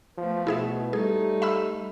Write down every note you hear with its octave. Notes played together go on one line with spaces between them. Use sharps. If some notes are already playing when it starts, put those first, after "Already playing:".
F3 A3 B3
B2 E4 G#4 E5
G3 A3 D#4 G#4
E5 B5 E6